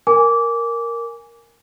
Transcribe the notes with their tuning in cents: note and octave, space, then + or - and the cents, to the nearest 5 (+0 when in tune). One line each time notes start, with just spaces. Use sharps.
A#4 +0 G#5 +0 D6 -20